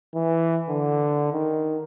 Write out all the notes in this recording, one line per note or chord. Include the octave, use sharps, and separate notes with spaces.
E3
D3
D#3